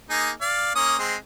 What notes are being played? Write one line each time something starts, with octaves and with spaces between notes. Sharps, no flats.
A#3 D#4 G#4
D5 F5
A#3 C#4 D#6
G#3 C4